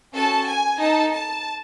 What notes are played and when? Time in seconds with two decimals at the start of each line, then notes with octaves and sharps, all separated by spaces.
0.15 C#4 F#4 A4 A5
0.47 G#5
0.79 D#4 A4 A5
1.12 A5